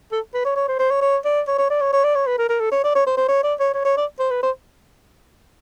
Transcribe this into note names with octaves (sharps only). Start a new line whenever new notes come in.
A4
B4
C#5
C#5
C5
C5
C#5
C#5
D5
C#5
C#5
D5
C#5
C#5
D5
C#5
B4
A#4
A#4
A4
C#5
D5
C#5
C5
C5
C#5
D5
C#5
C#5
C#5
D5
C5
B4
C5